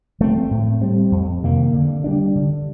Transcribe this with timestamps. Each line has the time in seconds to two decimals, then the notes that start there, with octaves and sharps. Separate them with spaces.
0.20 F3 A3 C4
0.51 A2
0.81 G3 C4
1.12 F2
1.43 C3 D#3 A#3
1.73 D3
2.04 G3 A#3 D4
2.36 D3